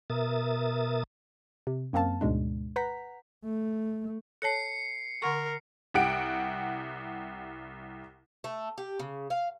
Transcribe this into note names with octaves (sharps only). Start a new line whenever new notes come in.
B2 A#4 E5 D#6 A6
C3
F#2 A#3 C4 F5 A5
D2 G#2 B2 G#3 D4
B4 F#5 A#5 G6 B6
A3
A4 C#5 A5 C7 C#7
D3 A#4 F#5 C#6
C2 G4 F#5 D7
A3
G4
C#3
F5